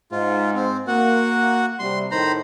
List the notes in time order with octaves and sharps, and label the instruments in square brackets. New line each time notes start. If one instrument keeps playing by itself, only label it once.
[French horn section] G#2 [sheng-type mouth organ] F4
[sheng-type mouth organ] C4
[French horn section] A#3 [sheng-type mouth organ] F#4 F#5
[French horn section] C3 G3 [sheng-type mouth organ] C6
[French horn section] A2 D#3 [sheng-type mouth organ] C5 A#5 B5